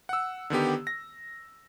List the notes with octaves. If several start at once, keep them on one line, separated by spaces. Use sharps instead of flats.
F#5 E6
D3 D#3 B3 G4
A#6